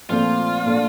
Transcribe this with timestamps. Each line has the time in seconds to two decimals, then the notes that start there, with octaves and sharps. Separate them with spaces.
0.09 A#2 F3 A3 C4 F4
0.64 A#2 A3 D4